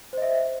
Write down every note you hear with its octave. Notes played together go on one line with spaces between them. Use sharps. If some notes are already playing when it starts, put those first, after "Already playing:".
C5 D#5 E5